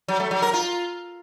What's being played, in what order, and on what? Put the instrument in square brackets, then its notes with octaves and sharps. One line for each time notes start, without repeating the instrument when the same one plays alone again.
[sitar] F#3
A3
F#3
A#4
F4